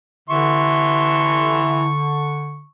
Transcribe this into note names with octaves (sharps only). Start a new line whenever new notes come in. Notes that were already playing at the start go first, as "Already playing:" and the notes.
D3 E3 E5 C6 C#6